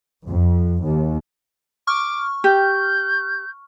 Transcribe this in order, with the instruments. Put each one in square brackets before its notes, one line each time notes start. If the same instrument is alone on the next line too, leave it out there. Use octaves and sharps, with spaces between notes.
[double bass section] F2
D#2
[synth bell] C#6 F6 [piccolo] D6
[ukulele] G4 [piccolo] G6